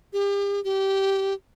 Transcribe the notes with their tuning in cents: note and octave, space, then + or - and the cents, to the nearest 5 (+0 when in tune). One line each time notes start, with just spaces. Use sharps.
G4 +40
G4 -15